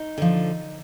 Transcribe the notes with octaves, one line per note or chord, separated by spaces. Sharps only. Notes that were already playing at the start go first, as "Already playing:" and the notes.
Already playing: D#4
D3 F3